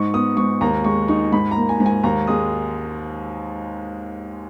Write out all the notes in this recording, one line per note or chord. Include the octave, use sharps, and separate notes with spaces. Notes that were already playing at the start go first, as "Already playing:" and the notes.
Already playing: G#2 D#4 C#6
B3 D#6
G#2 C#6
D#2 A#5
G#3 C#6
D#4 C#6
G#2 B5
A#5
A#3
G#5
G#2
G#5
D#2 A#5
G#3 D#6